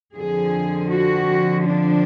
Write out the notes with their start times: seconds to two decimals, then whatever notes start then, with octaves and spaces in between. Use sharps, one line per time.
0.15 F2 D3 F3 G#4
0.89 F#4
1.64 D4